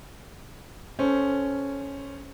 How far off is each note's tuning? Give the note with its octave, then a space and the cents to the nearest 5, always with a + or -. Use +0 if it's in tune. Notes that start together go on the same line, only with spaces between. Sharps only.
C#4 +0 A4 -15 C5 +0